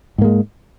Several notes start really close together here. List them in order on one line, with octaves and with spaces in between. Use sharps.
G#2 A#3 G#3